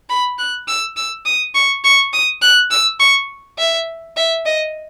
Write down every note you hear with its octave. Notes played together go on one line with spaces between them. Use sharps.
B5
F#6
E6
E6
D#6
C#6
C#6
D#6
F#6
E6
C#6
E5
E5
D#5